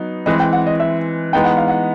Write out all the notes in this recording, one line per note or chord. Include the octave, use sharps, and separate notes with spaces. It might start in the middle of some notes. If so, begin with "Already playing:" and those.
Already playing: F#3 B3 D#4
E3 G#3 C4 E4 D#5
G5
F#5
D#5
E5
E3 G#3 B3 D#4 G5
F#5
F5
F#5